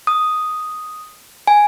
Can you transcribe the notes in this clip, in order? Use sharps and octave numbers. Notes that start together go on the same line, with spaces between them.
D#6
G#5